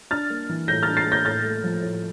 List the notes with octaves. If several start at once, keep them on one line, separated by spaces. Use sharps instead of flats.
D4 F6 A6
A#3
E3
A2 G6 A#6
D4 F6 A6
A6 C7
A#3
G6 A#6
A2 F6 A6
A3
F3
A2